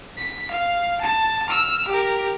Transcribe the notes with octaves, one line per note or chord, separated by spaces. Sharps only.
B6
F5
A5
E6 F6
G4 A#4